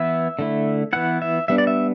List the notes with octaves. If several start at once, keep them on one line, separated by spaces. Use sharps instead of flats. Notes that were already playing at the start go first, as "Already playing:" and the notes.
Already playing: E3 B3 E4 E5
D3 A3 E4
E3 B3 E4 F#5
E5
G3 B3 D4 E5
D5
E5